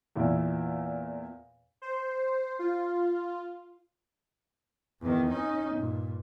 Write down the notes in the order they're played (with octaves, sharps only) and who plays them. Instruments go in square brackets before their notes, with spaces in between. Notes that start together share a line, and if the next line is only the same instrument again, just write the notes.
[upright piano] E2 A#2 E4
[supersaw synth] C5
F4
[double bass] E2 D#3
C#4 D#4
G2 A#2